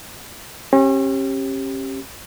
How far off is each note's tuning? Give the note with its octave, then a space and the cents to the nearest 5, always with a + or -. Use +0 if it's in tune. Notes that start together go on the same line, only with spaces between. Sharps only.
C#4 -40 G4 +0